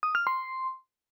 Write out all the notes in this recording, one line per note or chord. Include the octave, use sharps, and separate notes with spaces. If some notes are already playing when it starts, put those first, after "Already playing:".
D#6
F6
C6